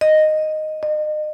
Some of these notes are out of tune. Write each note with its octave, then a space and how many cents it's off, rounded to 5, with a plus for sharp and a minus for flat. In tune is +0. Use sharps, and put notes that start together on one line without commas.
D#5 -5
D#5 -35